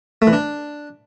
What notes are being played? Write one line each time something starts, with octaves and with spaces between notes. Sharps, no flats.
A3
E3
D4